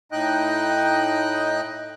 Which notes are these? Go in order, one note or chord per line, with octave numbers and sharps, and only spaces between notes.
A2 D#4 D#5 G5 F#6